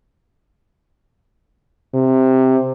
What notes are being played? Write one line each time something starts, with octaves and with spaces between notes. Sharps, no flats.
C3